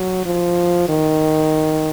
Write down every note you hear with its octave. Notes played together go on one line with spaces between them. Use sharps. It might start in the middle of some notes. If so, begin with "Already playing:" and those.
Already playing: F#3
F3
D#3